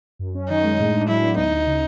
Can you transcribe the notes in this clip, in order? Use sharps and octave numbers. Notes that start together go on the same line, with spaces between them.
F#2
C#4
D#3 D#4
G#3
A2
D4
F#3 E4
B3
D2 D#4
D2
C#3